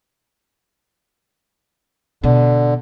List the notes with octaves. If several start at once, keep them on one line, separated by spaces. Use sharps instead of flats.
B2 D3